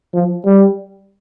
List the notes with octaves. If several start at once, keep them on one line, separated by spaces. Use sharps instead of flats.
F3
G3